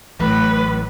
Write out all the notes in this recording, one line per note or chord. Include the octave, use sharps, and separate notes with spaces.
A1 A2 E3 F#3 B4